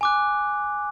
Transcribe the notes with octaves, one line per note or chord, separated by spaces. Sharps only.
G#5 D6 F#6